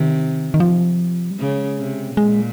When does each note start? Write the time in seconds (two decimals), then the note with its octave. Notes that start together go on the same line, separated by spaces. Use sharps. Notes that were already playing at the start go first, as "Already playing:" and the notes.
Already playing: C3 D#3
0.54 D#3
0.60 F3
1.31 G3
1.39 C#3 G#3
1.79 C3
2.17 A#2 G#3